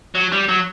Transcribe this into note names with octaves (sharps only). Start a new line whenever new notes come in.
F#3
G3
F#3